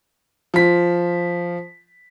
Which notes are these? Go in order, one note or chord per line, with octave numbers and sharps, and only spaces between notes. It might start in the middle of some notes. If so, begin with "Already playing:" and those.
F3 B6